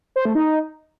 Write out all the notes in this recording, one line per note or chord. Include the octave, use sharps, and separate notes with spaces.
C5
A3
D#4